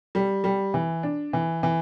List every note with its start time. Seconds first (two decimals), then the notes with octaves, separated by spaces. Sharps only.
0.15 G3
0.44 G3
0.74 E3
1.03 D4
1.33 E3
1.63 E3